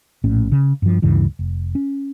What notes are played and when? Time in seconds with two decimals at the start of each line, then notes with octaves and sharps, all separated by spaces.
0.24 A#1 A2 C#4
0.52 C#3
0.82 G2 F3
1.02 D2 G2 C#3 E3
1.39 F1
1.75 C#4